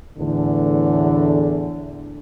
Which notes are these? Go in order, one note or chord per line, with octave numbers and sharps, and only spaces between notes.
E2 A2 D3